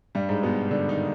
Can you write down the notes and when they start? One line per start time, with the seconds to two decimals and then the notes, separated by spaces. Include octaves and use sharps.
0.15 G2 G3
0.29 G#2 G#3
0.43 B2 B3
0.71 D3 D4
0.89 D#3 D#4